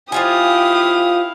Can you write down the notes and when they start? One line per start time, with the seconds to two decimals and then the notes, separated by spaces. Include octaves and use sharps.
0.12 F3 E4 F4 G4 F5 G#5 D#6